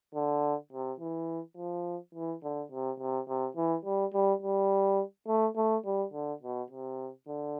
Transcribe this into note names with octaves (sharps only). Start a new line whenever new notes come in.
D3
C3
E3
F3
E3
D3
C3
C3
C3
E3
G3
G3
G3
A3
A3
G3
D3
B2
C3
D3